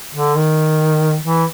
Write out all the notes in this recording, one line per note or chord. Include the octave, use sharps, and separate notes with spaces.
D3
D#3
E3